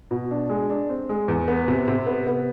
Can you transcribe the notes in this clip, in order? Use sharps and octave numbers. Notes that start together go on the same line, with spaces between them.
B2
D4
G#3
D4
C4
G#3
E2
B3
C3
C3
B3
B3